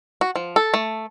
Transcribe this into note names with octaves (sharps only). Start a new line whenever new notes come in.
F#4
F3
A4
A3